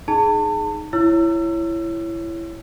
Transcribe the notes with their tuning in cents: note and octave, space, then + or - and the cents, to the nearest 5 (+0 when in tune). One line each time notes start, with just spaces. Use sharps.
D#4 +0 G#4 +15 A5 +35
E4 +20 C#5 +0 E6 +30